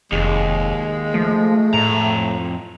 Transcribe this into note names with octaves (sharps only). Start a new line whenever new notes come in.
F1 D#2 G#3
F3 A3
F2 A2 A#5